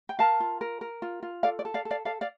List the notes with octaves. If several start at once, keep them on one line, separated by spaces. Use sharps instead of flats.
G5
A#4 F5 A5
F4
A#4
A#4
F4
F4
A4 D5 F5
D5
A4
D5 F5
A4
D5 F5
A4 D5 F5
D5 F5